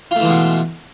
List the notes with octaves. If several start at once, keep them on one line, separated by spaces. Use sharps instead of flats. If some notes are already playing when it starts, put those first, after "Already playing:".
B2 E3 G#3 A3 F4